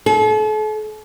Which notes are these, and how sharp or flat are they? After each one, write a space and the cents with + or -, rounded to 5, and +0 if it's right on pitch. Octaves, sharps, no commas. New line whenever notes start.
A4 -40